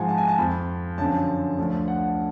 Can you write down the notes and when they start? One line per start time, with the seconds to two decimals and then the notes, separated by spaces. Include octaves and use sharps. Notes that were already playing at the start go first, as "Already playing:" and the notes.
Already playing: G#2 F3 F#5 G#5
0.08 A5
0.18 G#5
0.28 A5
0.38 F2 F3 B5
0.98 F#2 D3 F3 A5
1.58 D2 D3 F3
1.88 F#5